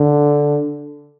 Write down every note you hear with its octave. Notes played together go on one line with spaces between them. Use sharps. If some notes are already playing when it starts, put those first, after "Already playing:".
Already playing: D3